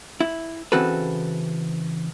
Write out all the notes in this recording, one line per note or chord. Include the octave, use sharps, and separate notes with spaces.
E4
C#3 E3 C4 F#4 A4 B4